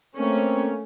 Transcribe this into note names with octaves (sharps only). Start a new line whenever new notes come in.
A3 A#3 C4 C#4